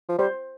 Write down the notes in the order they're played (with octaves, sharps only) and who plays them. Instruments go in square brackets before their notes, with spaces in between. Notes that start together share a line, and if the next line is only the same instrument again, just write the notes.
[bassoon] F3
[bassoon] G3 [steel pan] C5